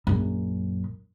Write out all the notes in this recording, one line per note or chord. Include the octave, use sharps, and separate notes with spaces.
A#1 F#2